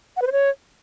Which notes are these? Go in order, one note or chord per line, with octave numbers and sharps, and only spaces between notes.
F#5
B4
C5
C#5